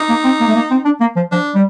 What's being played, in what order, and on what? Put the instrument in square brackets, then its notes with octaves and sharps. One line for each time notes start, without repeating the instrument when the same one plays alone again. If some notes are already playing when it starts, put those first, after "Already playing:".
Already playing: [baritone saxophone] D#4
[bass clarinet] A#3
C4
A#3
A3
A#3
C4
D4
A#3
F3
[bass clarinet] F3 [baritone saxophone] D4
[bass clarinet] G3